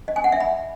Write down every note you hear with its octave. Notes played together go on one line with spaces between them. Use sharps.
D#5
G#5
F#5
E5
B5